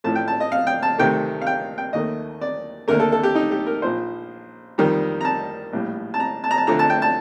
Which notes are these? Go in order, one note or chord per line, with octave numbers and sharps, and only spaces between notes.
A1 A2 F3 A3 A5
G5
A5
D#5
F5
G5
A5
D2 C3 D#3 A3 G5
F5
G5
G5
D#2 D#3 A3 D#5
D5
D#2 D3 A3 A#4
A4
A4
G4
D#4
G4
A#4
A#1 A#2 F3 C5
F2 D#3 G3
A#5
A5
A#1 A2 G3
A5
A#5
A5
A#5
A5
D2 D3 F3 A3 A#5
A5
G5
A5